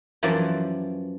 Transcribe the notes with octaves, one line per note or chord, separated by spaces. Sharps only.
F#2 E3 F3 D5